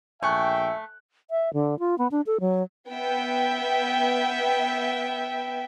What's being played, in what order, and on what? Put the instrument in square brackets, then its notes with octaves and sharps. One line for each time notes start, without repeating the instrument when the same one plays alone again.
[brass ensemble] A#1 G5 [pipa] A3 [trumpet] E5 [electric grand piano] G#5 C#6 F#6
[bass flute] E5
D3
F4
B3
D4
A4
F#3
[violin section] B3 E5 G5